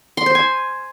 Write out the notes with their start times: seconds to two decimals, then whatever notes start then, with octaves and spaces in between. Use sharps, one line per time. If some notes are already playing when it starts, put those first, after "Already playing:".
0.17 C6
0.26 C5
0.35 G#5